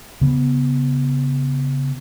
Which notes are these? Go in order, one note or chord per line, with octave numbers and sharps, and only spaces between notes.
C#3 B3